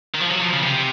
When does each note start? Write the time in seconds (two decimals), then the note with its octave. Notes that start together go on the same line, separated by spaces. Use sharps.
0.14 D#3
0.20 F3
0.31 F#3
0.42 F3
0.53 C#3
0.63 C3